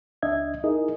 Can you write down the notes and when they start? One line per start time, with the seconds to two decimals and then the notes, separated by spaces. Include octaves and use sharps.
0.22 C#2 D4 D#5 E5 G#6
0.64 D#4 E4 G#4 A#4 D#5